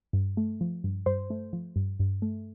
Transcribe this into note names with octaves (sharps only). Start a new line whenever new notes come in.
G2
A3
F3
G2
G2 C5
A3
F3
G2
G2
A3